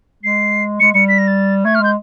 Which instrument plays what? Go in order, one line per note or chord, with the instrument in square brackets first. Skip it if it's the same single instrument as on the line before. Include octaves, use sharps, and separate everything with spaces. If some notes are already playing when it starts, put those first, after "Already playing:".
[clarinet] G#3 [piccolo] C7
[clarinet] G#3 [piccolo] C#7
[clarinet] G3 [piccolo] C#7
[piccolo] B6
A#6
A6
[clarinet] A3 [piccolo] G#6
[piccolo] F6
[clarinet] G#3 [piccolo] G6